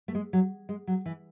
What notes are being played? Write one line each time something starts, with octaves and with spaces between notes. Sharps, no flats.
A3
G#3
F#3
G#3
F#3
E3